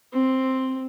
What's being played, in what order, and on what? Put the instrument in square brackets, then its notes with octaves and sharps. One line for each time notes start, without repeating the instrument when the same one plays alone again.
[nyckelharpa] C4